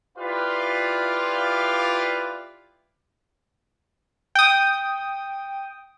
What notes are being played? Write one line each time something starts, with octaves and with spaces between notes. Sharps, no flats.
E4 F4 G4 B4 D5 F5
G5 D#6